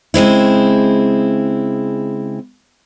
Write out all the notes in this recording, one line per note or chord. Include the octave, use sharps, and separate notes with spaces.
C#3 G#3 C4 E4